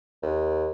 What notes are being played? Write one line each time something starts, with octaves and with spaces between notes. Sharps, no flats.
D#2